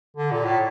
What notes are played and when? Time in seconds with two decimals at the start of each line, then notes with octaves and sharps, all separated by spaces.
0.17 D3
0.31 A#2
0.45 A2